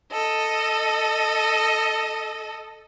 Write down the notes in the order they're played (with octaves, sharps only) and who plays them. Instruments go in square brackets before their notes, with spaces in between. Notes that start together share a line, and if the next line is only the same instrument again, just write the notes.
[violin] A4 D#5